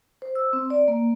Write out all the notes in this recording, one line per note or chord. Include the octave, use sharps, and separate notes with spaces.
C5
E6
C4
D5
A#3